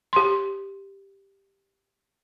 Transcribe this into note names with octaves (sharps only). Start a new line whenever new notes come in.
G4 C6